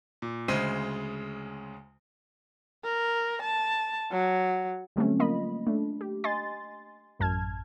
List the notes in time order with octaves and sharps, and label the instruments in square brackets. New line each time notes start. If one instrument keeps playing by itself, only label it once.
[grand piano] A#2
D2 C#3 G#3 C5 C6 D#7
[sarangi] A#4
A5
F#3
[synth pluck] D3 F#3 G3 A3 C4 C#4
A#3 F4 D#5 B5
A3 D4
G4
D#5 G#5 C6 A6
A1 F#2 A5 F6 G#6